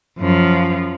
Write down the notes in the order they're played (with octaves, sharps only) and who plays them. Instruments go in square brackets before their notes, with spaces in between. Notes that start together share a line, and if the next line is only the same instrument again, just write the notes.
[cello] F#2 F3